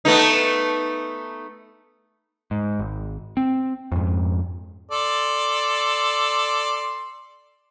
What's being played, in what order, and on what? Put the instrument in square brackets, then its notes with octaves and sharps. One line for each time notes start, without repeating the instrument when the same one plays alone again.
[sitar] A3 B3 D#4
[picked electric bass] G#2
G#1
C4
F2 G#2
[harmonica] A4 D5 C6